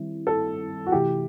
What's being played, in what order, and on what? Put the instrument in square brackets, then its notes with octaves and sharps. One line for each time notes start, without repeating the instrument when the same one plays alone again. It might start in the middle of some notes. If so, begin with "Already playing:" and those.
Already playing: [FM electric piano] D#3 G3 C4 E4
[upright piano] A4
F#4
[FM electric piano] C3 E3 A3 E4 [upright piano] G4